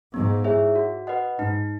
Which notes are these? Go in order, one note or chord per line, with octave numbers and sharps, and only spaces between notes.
G#2 B3
E4 G#4 C#5 E5
F#4
B4 D#5 F#5
G#2 D#4